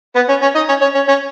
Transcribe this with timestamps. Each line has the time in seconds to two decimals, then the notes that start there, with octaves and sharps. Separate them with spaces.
0.15 B3 B4
0.29 C#4 C#5
0.42 C#4 C#5
0.55 D#4 D#5
0.69 C#4 C#5
0.81 C#4 C#5
0.95 C#4 C#5
1.08 C#4 C#5